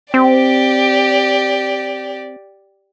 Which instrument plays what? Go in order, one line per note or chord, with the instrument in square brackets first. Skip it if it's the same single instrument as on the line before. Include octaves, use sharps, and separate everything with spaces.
[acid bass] C4 [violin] G4 D5